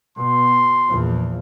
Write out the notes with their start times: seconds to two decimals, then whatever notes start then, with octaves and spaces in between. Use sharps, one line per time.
0.18 B2 C6
0.89 A#1 E2 F3